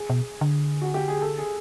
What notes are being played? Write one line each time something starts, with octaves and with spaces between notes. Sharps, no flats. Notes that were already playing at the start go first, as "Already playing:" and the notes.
Already playing: G#4
B2
D3
F#4
G4
G#4
A4
G#4